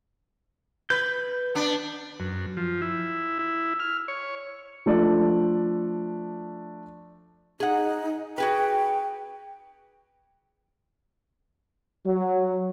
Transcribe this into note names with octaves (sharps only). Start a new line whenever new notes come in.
B4 G6
B3 D4
F#2
F3
E4
E4
F6
C#5
F3 A3 D4 D5
D#4 G#4 F#5
F#4 G#4 B4 G5
F#3